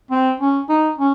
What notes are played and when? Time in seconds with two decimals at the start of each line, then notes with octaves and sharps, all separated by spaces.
0.11 C4
0.40 C#4
0.69 D#4
0.98 C#4